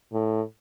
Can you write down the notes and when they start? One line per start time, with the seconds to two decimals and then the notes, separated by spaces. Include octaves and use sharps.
0.13 A2